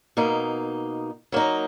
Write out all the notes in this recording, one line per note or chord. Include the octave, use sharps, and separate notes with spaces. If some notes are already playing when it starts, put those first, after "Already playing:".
B2 A#3 D#4
F#3 A#3 D#4